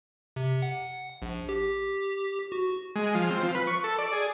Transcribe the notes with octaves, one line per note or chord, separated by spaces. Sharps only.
C3
F#5
A#1
G4
F#4
G#3
F3
C4
F3
B4
C#6
A4
D5
G#4